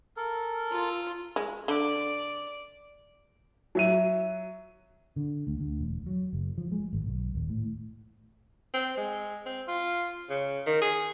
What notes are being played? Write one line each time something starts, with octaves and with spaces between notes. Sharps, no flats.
A4 A#4
F4
G#3
D3 D5
F#3 E5 D#7
D3
D2
D2
E1
F#3
F#1
F3
G#3
G#1
B1
D#1
A2
C4
G#3
C4
F4
C#3
D#3
G#4